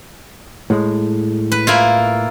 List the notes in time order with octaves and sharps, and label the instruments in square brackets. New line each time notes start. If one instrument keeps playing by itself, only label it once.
[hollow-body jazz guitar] A2 G#3
[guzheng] B4
A#3 E4 F4